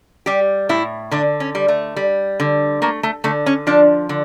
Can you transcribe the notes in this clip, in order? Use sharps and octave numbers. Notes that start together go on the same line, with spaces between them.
G3 G4
A2 E4
D3 D4
C#4
G3
A3
G3
D3
A3 A#3
A3
D3 A3
C#4
F3 D4
D3